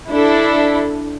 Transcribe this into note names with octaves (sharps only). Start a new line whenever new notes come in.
D4 E4 A4